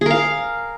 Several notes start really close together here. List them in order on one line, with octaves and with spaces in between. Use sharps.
G#4 A#4 F5